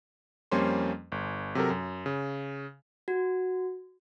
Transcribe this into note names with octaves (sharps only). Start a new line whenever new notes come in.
F2 G3 A#3 C#4 C5 C6
G1
C3 F#3 A4 A#4
F#2
C#3
F#4